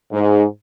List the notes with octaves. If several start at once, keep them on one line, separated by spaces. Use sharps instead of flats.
G#2